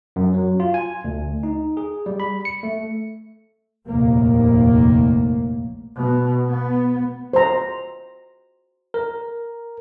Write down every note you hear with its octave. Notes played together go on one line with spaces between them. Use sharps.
F#2
F#3
F4
G#5
D2
D#4
G#4
G3
B5
C#7
A3
F1 A#1 D#2 A#3
B2
B3
C5 A#5
A#4